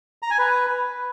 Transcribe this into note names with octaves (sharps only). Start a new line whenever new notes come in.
A#5
G#5
B4